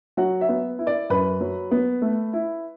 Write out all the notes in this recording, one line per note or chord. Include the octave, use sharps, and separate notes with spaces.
F#3 F#4 F#5
E5
B3
E4
D5 D6
F#2 B4 B5
F#3
B3
A3
E4